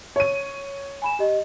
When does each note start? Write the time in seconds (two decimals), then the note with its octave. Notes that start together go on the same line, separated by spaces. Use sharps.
0.16 C#5 D#7
1.02 G#5 B5 E7
1.19 G4 D#5